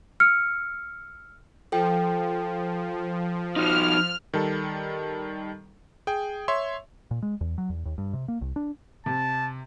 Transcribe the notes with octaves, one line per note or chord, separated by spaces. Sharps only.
E6 F6 C#7
F3 A4 G5
D#4 F#4 F6
D#3 G3 A4
G#4 G5
C#5 E5 C6
A#2
G#3
E2
F#3
E2
D#2
G2
C3
A#3
C2
D4
C3 A5